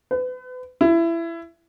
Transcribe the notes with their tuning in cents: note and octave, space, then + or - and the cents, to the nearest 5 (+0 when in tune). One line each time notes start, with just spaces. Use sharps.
B4 +35
E4 +20